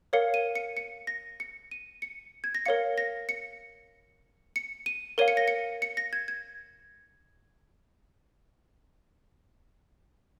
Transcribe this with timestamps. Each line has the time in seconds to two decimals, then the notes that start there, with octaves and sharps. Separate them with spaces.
0.13 A#4 C#5 F5 C#7
0.34 D#7
0.55 C#7
0.77 C#7
1.07 A#6
1.40 C#7
1.71 D#7
2.02 C#7
2.44 G#6
2.55 A#6
2.66 A#4 C#5 F5 C#7
2.98 A#6
3.29 C#7
4.56 C#7
4.86 D#7
5.18 A#4 C#5 F5 D#7
5.28 C#7
5.37 A#6
5.48 C#7
5.82 C#7
5.97 A#6
6.13 G#6
6.28 G#6